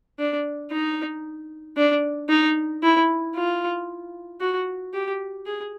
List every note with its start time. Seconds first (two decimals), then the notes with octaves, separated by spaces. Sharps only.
0.19 D4
0.72 D#4
1.77 D4
2.29 D#4
2.83 E4
3.36 F4
4.40 F#4
4.94 G4
5.46 G#4